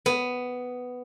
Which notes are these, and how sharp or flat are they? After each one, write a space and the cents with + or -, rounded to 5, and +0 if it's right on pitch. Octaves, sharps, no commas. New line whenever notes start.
B3 +10